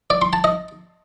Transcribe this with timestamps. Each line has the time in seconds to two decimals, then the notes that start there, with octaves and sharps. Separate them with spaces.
0.10 D5
0.22 C6
0.33 A5
0.44 D#5